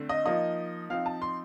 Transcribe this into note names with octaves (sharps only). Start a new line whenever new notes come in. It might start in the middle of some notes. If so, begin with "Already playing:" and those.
Already playing: D3 A3 C4
D#5
F3 A#3 D#4 D#5
F3 C4 D#4 F5
A5
C6